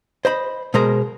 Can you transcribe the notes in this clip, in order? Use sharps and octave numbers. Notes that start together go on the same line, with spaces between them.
C5 D#5 B5
B2 G#3 A#4 C5 A#5